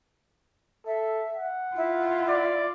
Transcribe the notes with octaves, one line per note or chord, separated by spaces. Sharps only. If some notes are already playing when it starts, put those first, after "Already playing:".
A4 E5
F#5
E4 F4
D5